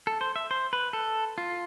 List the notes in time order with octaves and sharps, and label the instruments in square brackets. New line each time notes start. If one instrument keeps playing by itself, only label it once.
[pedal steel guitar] A4
C5
E5
C5
B4
A4
F4